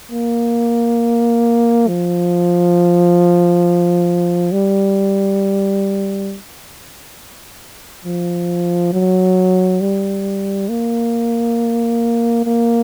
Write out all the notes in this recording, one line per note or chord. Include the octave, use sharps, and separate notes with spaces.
A#3
F3
G3
F3
F#3
G3
A#3
A#3